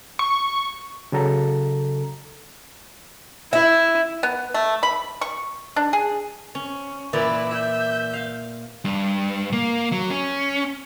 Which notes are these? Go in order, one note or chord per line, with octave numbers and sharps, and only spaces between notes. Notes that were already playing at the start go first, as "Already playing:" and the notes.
C#6
C#3 F#3 A4 A#5
E4 E5
B3
A3
B5
C#6
D4
G#4
C#4
A#2 E3 E4 B4 D5
E5 G6
F5
G2
A#3
F#3
C#4